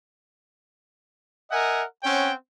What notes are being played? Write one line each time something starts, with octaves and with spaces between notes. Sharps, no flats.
A#4 D#5 E5 F#5 G#5
C4 C#4 C#5 F#5 G5